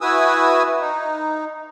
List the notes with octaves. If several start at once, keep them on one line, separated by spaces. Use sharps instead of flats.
E4 F#4 B4 G#5 D#6 E6
D#4